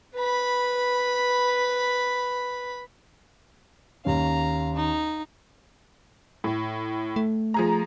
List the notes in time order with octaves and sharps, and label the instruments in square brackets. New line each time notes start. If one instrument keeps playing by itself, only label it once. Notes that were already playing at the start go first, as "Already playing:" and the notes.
[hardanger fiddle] B4 B5
[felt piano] D#2 C#4 [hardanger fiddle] F5 A#5
[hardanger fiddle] D#4
[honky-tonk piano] A2
[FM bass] A3
[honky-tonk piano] F3 G#4 A#5